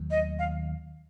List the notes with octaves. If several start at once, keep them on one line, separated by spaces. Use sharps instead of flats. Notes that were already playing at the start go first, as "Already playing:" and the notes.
Already playing: D#2 D#3 F#3 A3
D#5
F5